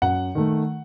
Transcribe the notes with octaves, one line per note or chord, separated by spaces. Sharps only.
F#2 F#5
D#3 A3